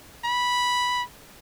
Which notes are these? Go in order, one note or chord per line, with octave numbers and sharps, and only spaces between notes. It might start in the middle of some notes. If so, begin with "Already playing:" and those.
B5